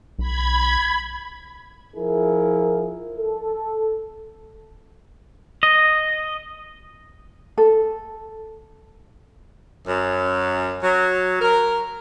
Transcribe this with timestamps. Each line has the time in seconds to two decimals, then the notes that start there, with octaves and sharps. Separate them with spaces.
0.19 B1 B5 G#6
1.96 F3 E4 G#4 A#4
3.18 A4
5.63 D#5
7.58 A4
9.86 F#2
10.83 F#3
11.40 A#4